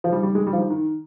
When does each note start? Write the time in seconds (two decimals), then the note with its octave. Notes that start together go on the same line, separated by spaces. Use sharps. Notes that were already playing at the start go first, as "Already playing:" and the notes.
0.04 F3
0.12 G3
0.23 G3
0.35 G#3
0.47 G3
0.53 F3
0.59 D#3
0.70 D#3